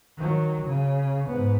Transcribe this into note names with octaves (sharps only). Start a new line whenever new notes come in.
D#3 F#3
C#3
G#2 B3